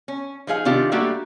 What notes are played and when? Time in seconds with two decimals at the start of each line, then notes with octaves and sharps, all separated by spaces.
0.08 C#4
0.47 F3 D#4 G#4 F5
0.65 C3 D#3 D4 F4 G4
0.92 G3 A3 A#3 D4 F#4 G4